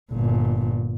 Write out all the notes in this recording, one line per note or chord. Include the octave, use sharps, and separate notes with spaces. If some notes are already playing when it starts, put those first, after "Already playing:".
G1 A#2